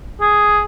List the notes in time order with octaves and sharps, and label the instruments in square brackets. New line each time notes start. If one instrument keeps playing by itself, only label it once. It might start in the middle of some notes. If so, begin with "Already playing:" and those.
[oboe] G#4